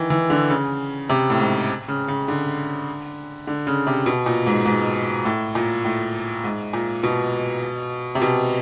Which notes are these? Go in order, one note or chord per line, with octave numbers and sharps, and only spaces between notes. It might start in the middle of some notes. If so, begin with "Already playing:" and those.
Already playing: D#3 E3
E3
D3
C#3
C3
A2
G#2
C#3
C#3
D3
D3
C#3
C3
B2
A#2
G#2
G#2
A2
A#2
A2
G#2
A#2
B2
C3
B2